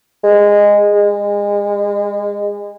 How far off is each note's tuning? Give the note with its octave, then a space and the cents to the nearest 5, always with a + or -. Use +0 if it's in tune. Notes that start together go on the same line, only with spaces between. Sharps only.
G#3 -15
G#3 -30